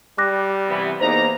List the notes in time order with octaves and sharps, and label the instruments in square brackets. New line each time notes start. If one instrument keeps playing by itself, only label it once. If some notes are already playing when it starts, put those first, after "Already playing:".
[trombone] G3 [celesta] D6 F#6 A#6
[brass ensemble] C3 E3 B3
[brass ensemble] E2 A#3 A#5 [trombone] D#4 [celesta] C5